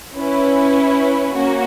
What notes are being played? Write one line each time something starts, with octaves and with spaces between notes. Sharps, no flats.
C#4 E4 B4
A#3 C#4 F#4